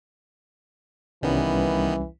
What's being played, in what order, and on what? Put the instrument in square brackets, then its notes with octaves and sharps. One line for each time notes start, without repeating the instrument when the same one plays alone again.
[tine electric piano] C2 G3 C#4 [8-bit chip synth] D#3 B3 [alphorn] E3